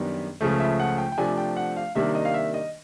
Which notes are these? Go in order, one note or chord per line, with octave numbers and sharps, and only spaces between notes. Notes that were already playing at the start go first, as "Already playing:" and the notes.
Already playing: F#2 D#3 G3 B3 D4
C#2 C#3 F3 A3
E5
F#5
G5
G5
C3 F3 A3 D4 G#5
G5
F#5
F5
C3 D#3 G3 A#3 D4 E5
D#5
F5
E5
D#5